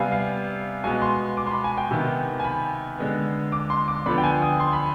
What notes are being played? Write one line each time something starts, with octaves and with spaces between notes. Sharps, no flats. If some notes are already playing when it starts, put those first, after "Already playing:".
Already playing: C3 G3 B3 F5 G#5
F5
B2 G#3 B3 G#5
C6
D6
C6
B5
G#5
G5
C3 D#3 B3
G#5
B5
D3 G#3 B3
D6
C6
D6
D3 F3 B3 B5
G5
G#5
D#6
C6
B5